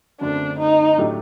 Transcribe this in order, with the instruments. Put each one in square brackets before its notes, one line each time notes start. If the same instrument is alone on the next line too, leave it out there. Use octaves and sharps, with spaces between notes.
[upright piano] F#2 D3 A3 C4 [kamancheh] D4
[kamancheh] D#4
[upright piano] A2 F#3 A3 D4 G4